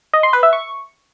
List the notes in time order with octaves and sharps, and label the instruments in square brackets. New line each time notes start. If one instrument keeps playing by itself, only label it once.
[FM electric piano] D#5
C6
B4
E5
C#6